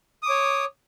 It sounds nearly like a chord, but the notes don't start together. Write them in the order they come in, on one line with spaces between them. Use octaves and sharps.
D#6 D6 C#5